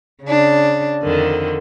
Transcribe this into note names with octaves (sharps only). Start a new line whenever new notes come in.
C#3 D4
F2 D3 D#3